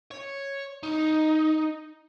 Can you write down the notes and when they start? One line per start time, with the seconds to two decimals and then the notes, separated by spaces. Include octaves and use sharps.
0.11 C#5
0.83 D#4